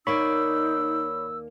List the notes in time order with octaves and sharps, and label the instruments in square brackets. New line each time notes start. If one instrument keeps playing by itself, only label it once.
[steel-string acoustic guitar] D#2 A#3 D5 [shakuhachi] D#4 [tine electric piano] C#5 B5 C#6 [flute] E6